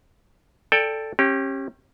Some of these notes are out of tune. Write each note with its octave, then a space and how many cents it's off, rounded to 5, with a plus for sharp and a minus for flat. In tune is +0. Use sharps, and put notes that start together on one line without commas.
A4 +5 D5 +0 G5 +20
C#4 -30 G4 +0